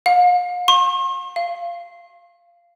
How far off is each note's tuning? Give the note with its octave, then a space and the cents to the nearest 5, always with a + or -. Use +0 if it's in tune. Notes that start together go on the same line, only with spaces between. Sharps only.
F5 +40
C6 +45
F5 -15